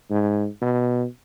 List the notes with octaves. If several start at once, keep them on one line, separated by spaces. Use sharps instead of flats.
G#2
B2